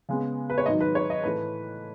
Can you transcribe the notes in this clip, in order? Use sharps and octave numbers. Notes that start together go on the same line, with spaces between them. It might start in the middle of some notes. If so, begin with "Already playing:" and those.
C#3 G#3 B3
B4
C#5
G#2 D#3 F#3 D#5
B4
C#5
D#5
A2 E3 A3 B4